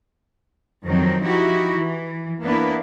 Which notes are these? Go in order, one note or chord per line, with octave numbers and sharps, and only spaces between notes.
F2 D#3 F#3 C4 D#4
F3 D#4 E4 F#4 G4
E3
A#3 B3 D4 E4 B4